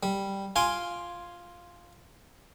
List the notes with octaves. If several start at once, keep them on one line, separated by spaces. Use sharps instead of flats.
G3
F4 G#5 C6 D6